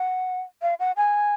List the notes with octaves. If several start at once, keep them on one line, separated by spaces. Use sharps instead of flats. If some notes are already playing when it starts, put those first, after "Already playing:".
Already playing: F#5
F5
F#5
G#5